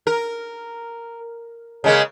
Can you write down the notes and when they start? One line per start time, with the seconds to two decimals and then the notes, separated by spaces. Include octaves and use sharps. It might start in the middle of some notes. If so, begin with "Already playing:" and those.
0.07 A#4
1.84 C#3 G#3 A#3